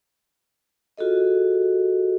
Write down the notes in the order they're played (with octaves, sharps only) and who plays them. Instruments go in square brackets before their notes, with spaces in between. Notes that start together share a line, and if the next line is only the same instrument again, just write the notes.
[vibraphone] F4 F#4 G#4 A4 D#5